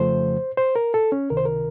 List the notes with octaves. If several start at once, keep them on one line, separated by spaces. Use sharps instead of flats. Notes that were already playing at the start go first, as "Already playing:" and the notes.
Already playing: F2 C#3 F3 A3 C5
C5
A#4
A4
C#4
C#2 C3 D#3 A#4
C5
A#4